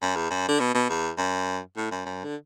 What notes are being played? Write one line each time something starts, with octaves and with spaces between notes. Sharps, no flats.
F#2
E2
F#2
D3
B2
B2
E2
F#2
A2
F#2
F#2
D3